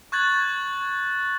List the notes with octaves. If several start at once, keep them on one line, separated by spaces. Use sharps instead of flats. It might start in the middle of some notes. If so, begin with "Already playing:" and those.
C#6 F#6 G#6 A6 F#7